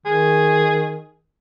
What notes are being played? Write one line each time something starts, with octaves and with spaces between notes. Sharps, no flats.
D#3 G#4